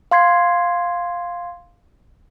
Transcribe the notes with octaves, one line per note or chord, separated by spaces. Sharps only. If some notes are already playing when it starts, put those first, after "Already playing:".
F5 C6 G#6 C7